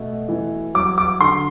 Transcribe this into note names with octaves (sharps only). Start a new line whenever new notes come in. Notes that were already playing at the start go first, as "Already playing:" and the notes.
Already playing: B2 A3
E3
F#3 D6
D6
D3 C6